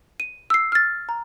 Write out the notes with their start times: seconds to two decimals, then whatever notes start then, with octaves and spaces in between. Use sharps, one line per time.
0.20 D#7
0.50 E6 C7
0.72 F6 A6
1.09 A#5